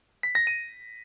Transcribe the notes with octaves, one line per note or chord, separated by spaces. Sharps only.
B6
A#6
D#7